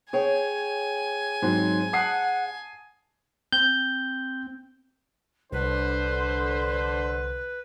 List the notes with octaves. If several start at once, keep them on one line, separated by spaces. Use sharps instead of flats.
G#4 C#5 G5 G#5
G#2 F#3 C4
F#5 A5 D#6 C7
C4 G6
C2 D3 B4 C5